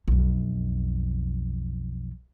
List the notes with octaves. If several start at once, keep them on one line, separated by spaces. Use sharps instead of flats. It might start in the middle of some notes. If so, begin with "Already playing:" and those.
B1 F2